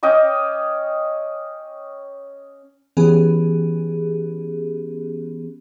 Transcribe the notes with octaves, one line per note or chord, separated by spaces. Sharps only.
C#4 D#5 G5 D6
E3 B3 C#4 G4 G#4